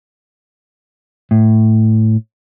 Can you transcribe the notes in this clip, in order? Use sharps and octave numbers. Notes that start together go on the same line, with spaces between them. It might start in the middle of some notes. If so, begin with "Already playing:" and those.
A2